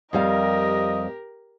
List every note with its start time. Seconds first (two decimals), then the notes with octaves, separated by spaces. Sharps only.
0.13 F2 G3 G4 A#4 D#5 F5